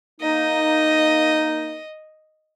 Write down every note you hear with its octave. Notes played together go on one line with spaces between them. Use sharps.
A#3 D#4 D#5